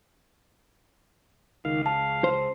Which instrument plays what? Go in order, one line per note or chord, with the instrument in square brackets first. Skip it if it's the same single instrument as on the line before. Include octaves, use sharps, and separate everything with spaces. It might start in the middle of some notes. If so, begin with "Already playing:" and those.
[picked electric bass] C#2 [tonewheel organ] D#3 F5
[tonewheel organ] F5 [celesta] A5
[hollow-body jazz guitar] C5